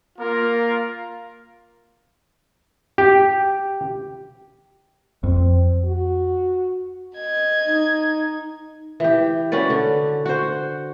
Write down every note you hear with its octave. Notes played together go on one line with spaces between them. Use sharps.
A#3 F4 A#4
G4
F2 C4
F#4
D#5 G#6
D#4
E3 G4
C#4 F#4 B4 D5
D3
F#4 C5